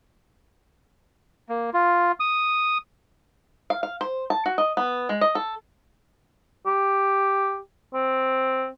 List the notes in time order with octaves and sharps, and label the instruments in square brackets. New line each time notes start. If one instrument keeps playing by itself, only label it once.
[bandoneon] A#3
F4
D#6
[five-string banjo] F5
F5
C5
A5
F#4
D#5
B3
G#3
D#5
A4
[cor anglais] G4
C4